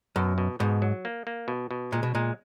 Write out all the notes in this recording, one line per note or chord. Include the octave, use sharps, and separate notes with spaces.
F#2 B2
B2
G#2 B2
F#3
A#3
A#3
B2
B2
A#2 G#3
B2
A#2 G#3